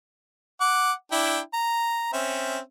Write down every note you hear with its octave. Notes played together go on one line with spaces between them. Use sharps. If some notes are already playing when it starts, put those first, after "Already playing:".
F#5 D6
D4 E4 G5
A#5
C4 C#4 E5